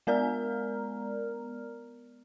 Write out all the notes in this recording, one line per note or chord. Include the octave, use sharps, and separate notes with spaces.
G#3 B3 A#4 D5 A#5 F6